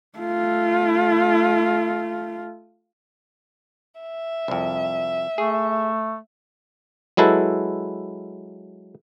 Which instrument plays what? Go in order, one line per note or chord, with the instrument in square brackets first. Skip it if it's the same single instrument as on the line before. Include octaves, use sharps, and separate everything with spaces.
[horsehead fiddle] A3 F4
[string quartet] E5
[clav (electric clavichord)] C2 F2
[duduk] A3 [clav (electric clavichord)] G#4
[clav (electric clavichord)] F#3 G#3 E4 A4 B4